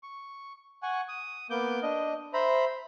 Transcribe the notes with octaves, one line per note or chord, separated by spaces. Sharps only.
C#6
F#5 G#5 C#6
D#6
A#3 B3 D6 G6
D4 D#5
C5 E5 A#5 B5